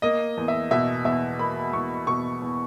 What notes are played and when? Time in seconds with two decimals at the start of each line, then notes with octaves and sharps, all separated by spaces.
0.02 A#3 D#5
0.37 E2
0.48 E5
0.71 B2 E5
1.05 E2 E5
1.39 A#3 B5
1.73 E2 C#6
2.07 B2 C#6
2.42 E2